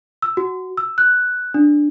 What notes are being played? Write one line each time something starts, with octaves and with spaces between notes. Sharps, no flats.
E6
F#4
E6
F#6
D4